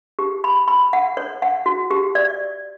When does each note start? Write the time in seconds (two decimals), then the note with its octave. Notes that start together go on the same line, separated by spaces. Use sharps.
0.19 G4
0.44 B5
0.68 B5
0.93 F#5
1.17 C#5
1.42 F#5
1.66 F#4
1.91 G4
2.15 D5